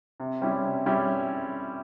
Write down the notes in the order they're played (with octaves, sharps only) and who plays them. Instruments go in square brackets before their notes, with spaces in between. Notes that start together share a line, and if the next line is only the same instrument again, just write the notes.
[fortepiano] C3
G3 C#4 E4
C3
G3 C#4 E4